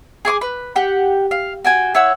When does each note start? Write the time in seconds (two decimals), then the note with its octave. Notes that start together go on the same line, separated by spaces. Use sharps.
0.25 G#4 G#5 C#6 D6
0.41 B4
0.76 G4 F#5
1.31 F5
1.65 F#4 G5 G#5
1.94 E4 C#5 F#5 E6